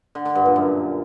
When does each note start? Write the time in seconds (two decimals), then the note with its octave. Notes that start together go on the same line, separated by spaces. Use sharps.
0.15 D3
0.25 D3
0.35 G2
0.46 A#2
0.56 F#2